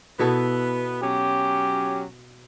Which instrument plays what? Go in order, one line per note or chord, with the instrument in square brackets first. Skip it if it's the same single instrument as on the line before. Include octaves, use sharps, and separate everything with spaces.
[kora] B2 E4 A4 [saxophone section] B3
[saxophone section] F#3 C#4 [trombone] G4